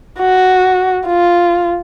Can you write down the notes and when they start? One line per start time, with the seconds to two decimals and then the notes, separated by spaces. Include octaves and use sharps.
0.20 F#4
1.07 F4